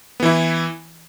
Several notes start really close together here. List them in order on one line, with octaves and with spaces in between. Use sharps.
B3 E3 E4